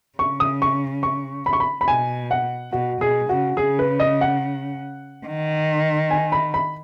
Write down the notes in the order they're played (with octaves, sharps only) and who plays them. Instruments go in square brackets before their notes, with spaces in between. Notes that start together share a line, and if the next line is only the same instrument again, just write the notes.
[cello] C#3 [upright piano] C#6
[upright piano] D#6
C#6
C#6
B5
C#6
B5
B5
[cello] B2 [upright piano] G#5
[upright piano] F#5
[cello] B2 [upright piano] F#4
[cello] B2 [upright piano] G#4
[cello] C#3 [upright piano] F#4
[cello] C#3 [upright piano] G#4
[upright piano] B4
D#5
F#5
[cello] D#3
[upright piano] G#5
B5
B5